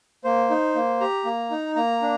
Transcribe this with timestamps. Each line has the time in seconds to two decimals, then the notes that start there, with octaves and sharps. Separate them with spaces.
0.24 A#3 C5
0.50 D#4
0.75 A#3
1.01 G4 A#5
1.25 A#3
1.51 D#4
1.76 A#3 A#5
2.02 D4